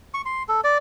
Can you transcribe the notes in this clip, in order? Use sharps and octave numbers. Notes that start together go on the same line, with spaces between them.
C#6
C6
A4
D5